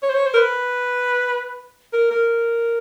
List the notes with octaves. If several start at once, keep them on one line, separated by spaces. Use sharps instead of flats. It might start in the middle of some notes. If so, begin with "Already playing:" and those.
C#5
C5
C#5
C5
A#4
B4
A#4
A#4